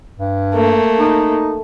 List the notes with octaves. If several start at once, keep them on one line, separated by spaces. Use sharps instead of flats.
G2
A3 A#3
D#4